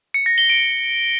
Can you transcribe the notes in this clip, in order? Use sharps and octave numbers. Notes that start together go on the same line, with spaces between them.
C#7
A#6
G7
D7